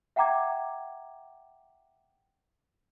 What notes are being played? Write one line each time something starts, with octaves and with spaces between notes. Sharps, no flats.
E5 F#5 G5 A#5 D6 G#6